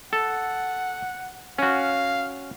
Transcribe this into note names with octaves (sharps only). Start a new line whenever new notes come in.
A4 F#5
C#4 F#4 F5